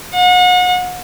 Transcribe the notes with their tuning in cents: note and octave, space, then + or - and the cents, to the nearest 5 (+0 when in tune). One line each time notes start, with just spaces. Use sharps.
F#5 -35